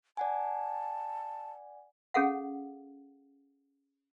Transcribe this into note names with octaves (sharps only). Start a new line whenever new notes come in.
D5 F#5 G#5 A5
C#4 G#4 A4 F5 F#5